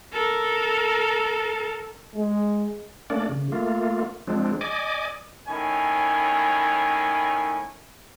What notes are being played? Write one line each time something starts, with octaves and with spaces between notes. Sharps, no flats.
A4 A#4
G#3
A3 A#3 C#4 D4 D5
C#3
A3 A#3 F4
F3 G#3 C4 D4
D5 D#5 G#5 D6
A2 D#3 C#4 G#5